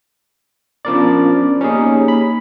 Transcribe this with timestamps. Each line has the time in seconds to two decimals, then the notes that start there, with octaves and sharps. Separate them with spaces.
0.85 F3 B3 C#4 D4 A#4 D5
1.61 A#3 C#4 D#4 G4 G#4 C#5
2.08 B5